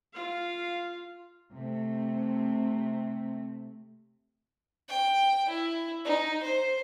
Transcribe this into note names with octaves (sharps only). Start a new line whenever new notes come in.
F4 F5
C3 A3
G5
E4
D#4
C5